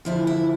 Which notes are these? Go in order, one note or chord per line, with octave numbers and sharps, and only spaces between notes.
D2 D3 F3 E4
E4